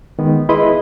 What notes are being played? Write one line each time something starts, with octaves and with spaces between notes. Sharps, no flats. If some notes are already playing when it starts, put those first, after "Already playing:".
D#3 G#3 B3
E4 G#4 B4 D#5 B5 C6